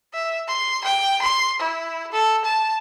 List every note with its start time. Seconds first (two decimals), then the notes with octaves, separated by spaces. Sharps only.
0.14 E5
0.48 C6
0.85 G5
1.22 C6
1.60 E4
2.13 A4
2.45 A5